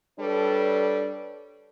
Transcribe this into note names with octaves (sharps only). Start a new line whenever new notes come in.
G3 D4 A4 B4 C#5